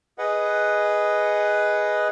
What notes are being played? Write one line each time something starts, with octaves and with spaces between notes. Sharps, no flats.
G#4 B4 D#5 F#5